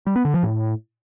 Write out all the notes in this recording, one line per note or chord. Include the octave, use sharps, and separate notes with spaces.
G3
B3
D3
F3
A2